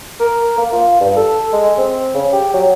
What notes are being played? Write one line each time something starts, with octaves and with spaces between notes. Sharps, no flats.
A#4
A#3
F4
G2
A4
G#3
C4
C#3
G4
F#3